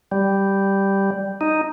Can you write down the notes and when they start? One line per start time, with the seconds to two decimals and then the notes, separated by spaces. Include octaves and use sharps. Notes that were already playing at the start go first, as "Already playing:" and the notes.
0.12 G3
1.41 D#4